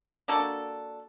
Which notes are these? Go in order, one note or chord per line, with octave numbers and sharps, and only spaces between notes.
A#3 D4 F#4 A4